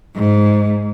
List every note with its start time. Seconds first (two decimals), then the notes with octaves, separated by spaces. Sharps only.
0.15 G#2